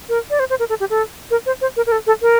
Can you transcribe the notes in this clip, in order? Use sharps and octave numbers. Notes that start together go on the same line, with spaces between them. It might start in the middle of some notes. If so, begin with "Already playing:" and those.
A#4
D5
C5
C5
A#4
A4
G4
A4
A#4
C5
C5
A#4
A#4
A4
A4
A#4